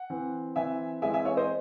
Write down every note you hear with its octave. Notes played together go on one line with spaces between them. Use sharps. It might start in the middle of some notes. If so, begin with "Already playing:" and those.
Already playing: F#5
E3 C4
E3 C4 E5 G#5
E3 G#3 C4 E5 G#5
E5 G#5
C#5 E5
C5 D#5